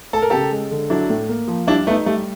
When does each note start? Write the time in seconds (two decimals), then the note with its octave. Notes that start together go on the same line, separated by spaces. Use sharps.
0.13 A3 A4
0.22 A#4
0.30 C#3 G4 A4
0.52 G#3
0.71 D3
0.90 F#3 D4 E4
1.10 A2
1.29 A#3
1.48 F3
1.67 G3 D4 E4
1.87 A3 B3 D#4
2.06 G3 A3